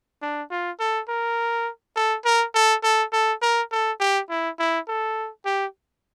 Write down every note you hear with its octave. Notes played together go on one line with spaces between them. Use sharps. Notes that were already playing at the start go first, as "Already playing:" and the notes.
D4
F4
A4
A#4
A4
A#4
A4
A4
A4
A#4
A4
G4
E4
E4
A4
G4